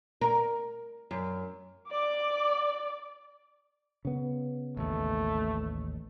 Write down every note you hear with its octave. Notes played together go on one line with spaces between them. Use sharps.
A#4
F#2
D5 D6
C#3 B3
A1 D#2 A3